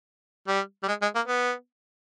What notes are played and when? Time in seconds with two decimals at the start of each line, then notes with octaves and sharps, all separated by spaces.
0.47 G3
0.83 G3
0.88 G#3
1.02 G#3
1.15 A#3
1.28 B3